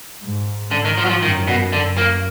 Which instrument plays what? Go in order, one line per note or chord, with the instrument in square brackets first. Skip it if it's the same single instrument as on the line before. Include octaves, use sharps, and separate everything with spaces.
[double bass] G#2
[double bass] G#2 [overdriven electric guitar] D3
[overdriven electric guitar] D#3
F3
F#3
F3
[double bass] F#2 [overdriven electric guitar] D#3
[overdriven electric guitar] B2
[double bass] F#2 [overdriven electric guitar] D3
[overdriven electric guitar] A#3